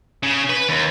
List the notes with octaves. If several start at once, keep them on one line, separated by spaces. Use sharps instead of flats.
C#3
B4
D#2